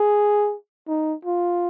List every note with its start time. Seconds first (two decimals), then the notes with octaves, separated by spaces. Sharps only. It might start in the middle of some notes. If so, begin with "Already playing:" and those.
Already playing: G#4
0.88 D#4
1.25 F4